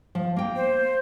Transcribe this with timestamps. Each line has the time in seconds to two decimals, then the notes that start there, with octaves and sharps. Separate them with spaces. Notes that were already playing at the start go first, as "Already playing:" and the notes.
0.15 F3
0.36 A#3 G5
0.56 C5